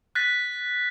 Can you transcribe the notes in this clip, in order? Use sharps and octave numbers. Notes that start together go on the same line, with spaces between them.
F#6 A6 B6